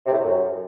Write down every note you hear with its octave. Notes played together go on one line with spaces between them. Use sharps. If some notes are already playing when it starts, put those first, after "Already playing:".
C3
A2
C3
F#2